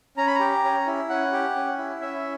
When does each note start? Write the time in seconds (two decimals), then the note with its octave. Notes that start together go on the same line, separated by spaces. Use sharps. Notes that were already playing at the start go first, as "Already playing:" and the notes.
0.17 C#4 A#5
0.27 B5
0.35 A#5
0.40 G4
0.64 C#4
0.87 E4
1.09 C#4 F#5
1.32 G4
1.56 C#4
1.78 E4
2.01 C#4 E5